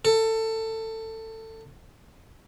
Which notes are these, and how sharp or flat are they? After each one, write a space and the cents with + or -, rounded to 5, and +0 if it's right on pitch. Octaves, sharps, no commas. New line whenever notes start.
A4 +20